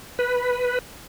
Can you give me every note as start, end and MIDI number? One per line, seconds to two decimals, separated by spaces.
0.19 0.79 71